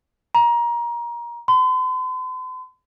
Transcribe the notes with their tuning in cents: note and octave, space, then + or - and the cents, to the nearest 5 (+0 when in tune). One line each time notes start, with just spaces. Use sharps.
A#5 +25
C6 -45